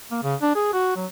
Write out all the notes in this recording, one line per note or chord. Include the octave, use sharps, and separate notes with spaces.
A#3
C#3
D4
G#4
F#4
F#3